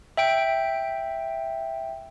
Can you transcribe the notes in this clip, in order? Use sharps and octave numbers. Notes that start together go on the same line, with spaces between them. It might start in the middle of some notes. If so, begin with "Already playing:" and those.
E5 G5 D7